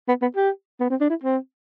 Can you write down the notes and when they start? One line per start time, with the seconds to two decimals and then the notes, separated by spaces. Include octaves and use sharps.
0.08 B3
0.22 B3
0.36 G4
0.80 B3
0.90 C4
1.01 D4
1.10 E4
1.24 C4